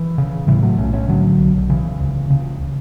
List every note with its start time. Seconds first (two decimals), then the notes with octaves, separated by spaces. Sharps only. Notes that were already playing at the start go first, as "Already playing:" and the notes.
Already playing: E3
0.18 C#3
0.48 A2 E3 G3
0.63 F#3 A3
0.78 B1 A3 C#4
0.93 A3 C#4
1.08 A2 D3 F#3
1.39 B1
1.70 C#3 E3
2.00 C#2
2.30 C#3